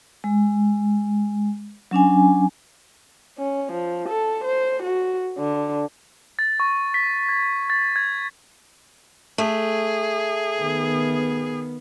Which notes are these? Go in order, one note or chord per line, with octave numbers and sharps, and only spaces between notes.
G#3
F#3 C#4 D4 G#5
C#4
F3
A4
C5
F#4
D3
A6
C#6
B6
G#6
A6
G#6
A3 G#4
D#3 B3